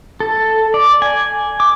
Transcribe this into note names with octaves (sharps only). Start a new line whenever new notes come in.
A4
D5
G#5
D6